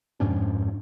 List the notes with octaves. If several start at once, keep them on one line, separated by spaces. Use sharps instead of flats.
F2 G#2 C#4 D4